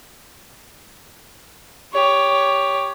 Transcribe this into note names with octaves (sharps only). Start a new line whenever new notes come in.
G4 C#5